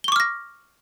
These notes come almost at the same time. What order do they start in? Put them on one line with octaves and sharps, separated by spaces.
G7 C#6 D6 F6 A#6